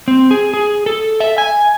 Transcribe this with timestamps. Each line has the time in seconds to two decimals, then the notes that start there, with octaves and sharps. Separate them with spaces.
0.08 C4
0.31 G#4
0.54 G#4
0.86 A4
1.20 E5
1.38 G#5